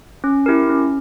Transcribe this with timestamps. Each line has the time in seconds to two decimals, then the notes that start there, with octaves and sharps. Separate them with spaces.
0.24 C#4
0.46 E4 G4 A#4
0.70 C#4